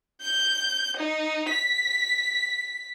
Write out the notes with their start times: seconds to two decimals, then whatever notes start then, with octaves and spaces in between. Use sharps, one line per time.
0.22 G6
0.97 D#4
1.50 B6